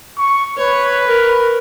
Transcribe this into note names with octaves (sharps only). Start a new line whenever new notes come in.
C#6
B4 C#5
A#4